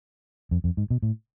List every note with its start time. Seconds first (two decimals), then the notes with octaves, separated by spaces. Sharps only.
0.51 F2
0.64 F2
0.77 G#2
0.90 B2
1.02 A2